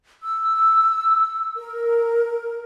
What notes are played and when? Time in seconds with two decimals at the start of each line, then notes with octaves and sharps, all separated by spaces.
0.23 E6
1.57 A#4